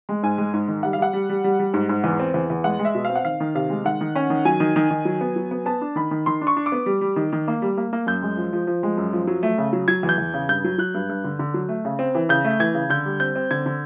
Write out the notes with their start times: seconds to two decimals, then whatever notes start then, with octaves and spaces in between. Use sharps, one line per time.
0.09 G#3
0.23 G#2 G#5
0.38 G#3
0.53 G#2
0.68 D#3
0.83 G3 F#5
0.93 F5
0.98 G3 F#5
1.13 G3
1.29 G3
1.44 G3
1.59 G3
1.74 G#2
1.89 G#2
2.04 E2
2.20 C4
2.34 E2
2.50 E2
2.64 G#3 F#5
2.79 G#3
2.85 E5
2.95 B2
3.05 C4 F5
3.15 F#5
3.25 D#3 F5
3.40 D#3
3.55 C3 F5
3.70 G#3
3.85 D#3 F#5
4.01 D#3
4.16 C#4
4.30 D#3
4.45 F#3 G#5
4.60 D#3
4.76 D#3
4.91 D#3
5.05 F#3
5.21 B3
5.36 F#3
5.51 B3
5.66 B3 A5
5.81 D4
5.96 D#3 B5
6.11 D#3
6.26 D#3 C6
6.41 D4
6.47 C#6
6.57 D4
6.66 D6
6.72 B3
6.86 G3
7.01 G3
7.16 D#3
7.33 D#3
7.48 A#3
7.62 G3
7.77 A#3
7.93 A#3
8.07 F#2 G6
8.22 G#3
8.37 F3
8.53 F3
8.67 F3
8.83 G#3
8.98 F#2
9.13 F3
9.27 F#3
9.43 A3
9.58 C#3
9.73 F#3
9.88 F#3 G#6
10.03 E2
10.09 G6
10.18 E2
10.34 C#3
10.49 G2 G6
10.64 F#3
10.78 F#3 F#6
10.94 G2
11.09 G2
11.24 D3
11.39 D3
11.54 F#3
11.69 A3
11.85 C#3
11.99 C4
12.15 E3
12.29 C#3 G6
12.45 A3
12.60 E3 G#6
12.74 C#3
12.90 D3 G6
13.05 G3
13.20 C4 G6
13.35 C4
13.51 D3 G#6
13.66 D3